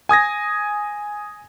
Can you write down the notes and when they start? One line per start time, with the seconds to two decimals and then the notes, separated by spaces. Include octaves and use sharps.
0.09 G#5 D#6 G#6 A#6